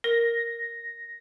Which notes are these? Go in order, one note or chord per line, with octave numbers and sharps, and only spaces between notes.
A#4 A#6